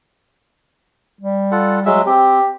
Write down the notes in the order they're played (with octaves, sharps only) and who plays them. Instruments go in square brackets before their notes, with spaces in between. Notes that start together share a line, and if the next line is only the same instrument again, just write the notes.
[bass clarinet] G3
[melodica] F4 A4 F#5
F#3 G#3 E5
[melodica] C4 [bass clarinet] G4